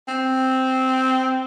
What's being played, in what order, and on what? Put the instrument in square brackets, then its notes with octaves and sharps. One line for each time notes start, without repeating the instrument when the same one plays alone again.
[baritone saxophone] C4